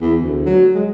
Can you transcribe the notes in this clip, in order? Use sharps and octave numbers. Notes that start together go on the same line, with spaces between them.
E2
D2
F#3
G#3